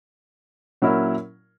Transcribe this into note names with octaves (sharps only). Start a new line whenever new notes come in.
A#2 F#3 C#4 E4 A#4